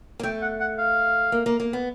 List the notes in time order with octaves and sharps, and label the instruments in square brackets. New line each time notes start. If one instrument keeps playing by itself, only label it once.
[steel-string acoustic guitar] A#3
[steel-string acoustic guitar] A3 [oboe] G5
[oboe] F#5
F#5
F5
[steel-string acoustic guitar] A#3
A#3
A#3
B3